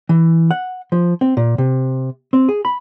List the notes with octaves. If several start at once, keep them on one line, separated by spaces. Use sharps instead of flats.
E3
F#5
F3
C4
A#2
C3
C4
G#4
B5